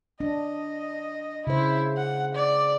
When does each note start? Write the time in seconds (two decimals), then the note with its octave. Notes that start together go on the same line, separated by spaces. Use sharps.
0.20 D4 D#5
1.47 C#3 E4 C5
1.97 F#5
2.35 D5